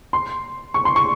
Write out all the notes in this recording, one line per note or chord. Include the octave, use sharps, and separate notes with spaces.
C6
C#6
C6
C#6